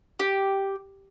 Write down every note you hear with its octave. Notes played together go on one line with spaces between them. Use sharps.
G4